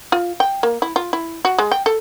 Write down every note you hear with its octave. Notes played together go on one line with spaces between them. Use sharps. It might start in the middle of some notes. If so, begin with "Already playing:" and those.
F4
G5
A#3
E4
F4
E4
F#4
G#3
G5
A4